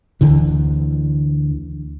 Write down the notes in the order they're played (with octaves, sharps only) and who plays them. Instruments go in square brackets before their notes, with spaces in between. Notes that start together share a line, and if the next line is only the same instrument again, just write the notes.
[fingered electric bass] D2 D3 E3